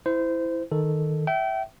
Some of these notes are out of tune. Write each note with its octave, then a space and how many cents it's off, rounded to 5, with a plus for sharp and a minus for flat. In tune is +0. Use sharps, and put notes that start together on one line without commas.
E4 +0 C5 -25
D#3 +0 A4 +0
E5 +0 G5 -30